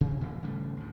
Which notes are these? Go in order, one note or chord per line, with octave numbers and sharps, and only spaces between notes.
C3
A#2 E3 F3 A3
G#1 C#3 G3 A3
D2 A2